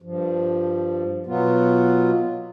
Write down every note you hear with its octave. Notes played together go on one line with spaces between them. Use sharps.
G2 F3
B2 F#3 B3 F4